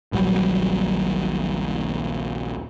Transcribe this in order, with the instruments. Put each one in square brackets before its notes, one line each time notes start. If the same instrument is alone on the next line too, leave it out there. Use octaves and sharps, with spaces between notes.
[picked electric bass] D#1 A#1 F#3 G3